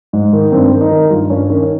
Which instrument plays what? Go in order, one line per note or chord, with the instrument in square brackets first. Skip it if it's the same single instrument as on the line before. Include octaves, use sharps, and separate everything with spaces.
[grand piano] G#2
D#3
G2 C4
D#3
D#4
D#3
G2 F4
G2 C#4
D#3 C#4